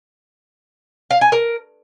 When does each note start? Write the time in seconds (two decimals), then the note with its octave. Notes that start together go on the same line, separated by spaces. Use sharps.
1.11 F5
1.21 G#5
1.32 A#4